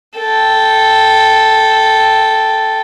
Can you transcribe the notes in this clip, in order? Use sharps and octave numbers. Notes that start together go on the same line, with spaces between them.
A4 G5